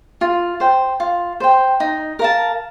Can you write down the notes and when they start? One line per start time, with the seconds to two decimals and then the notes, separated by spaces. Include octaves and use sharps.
0.21 F4
0.60 C5 G5
1.00 F4
1.40 C5 G5
1.80 D#4
2.19 A#4 F5 A5